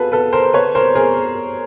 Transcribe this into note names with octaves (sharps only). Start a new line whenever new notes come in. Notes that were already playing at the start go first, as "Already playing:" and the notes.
Already playing: F4 F#4 G#4 A4 B4
A4 B4
A#4 C5
B4 C#5
A#4 C5
G#4 A#4